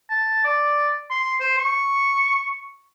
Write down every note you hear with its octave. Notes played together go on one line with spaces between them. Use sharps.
A5
D5
C6
C5
C#6